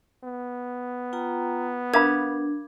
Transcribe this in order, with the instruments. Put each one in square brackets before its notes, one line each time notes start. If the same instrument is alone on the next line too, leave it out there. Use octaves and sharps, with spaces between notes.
[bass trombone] B3
[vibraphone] F4 G5 A#5
[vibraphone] D4 [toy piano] A#4 F5 B5 [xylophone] D6 G#6